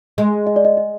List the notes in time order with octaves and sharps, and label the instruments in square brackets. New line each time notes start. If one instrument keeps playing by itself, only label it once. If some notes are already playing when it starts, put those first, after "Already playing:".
[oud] G#3
[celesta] D#5
D5
D#5
D#5